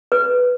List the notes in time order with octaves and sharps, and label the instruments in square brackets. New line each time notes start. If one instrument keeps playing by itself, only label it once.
[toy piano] B4